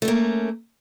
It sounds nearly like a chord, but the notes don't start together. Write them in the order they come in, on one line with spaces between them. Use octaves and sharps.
A3 C#4 A#3